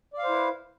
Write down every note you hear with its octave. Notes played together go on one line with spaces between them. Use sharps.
E4 B4 C5 D5 F5